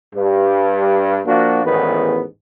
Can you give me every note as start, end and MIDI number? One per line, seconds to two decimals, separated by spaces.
0.15 1.20 43
1.26 1.63 53
1.26 1.63 58
1.26 1.63 62
1.26 1.63 66
1.65 2.23 33
1.65 2.23 40
1.65 2.23 44
1.65 2.23 51
1.65 2.23 59